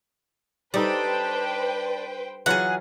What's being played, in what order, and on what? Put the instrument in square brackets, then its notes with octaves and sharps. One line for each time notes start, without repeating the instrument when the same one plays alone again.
[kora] G3 D#4 A4 [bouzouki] D4 [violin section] B4 C5 G5
[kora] E3 F#3 F4 [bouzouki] G#4 F#5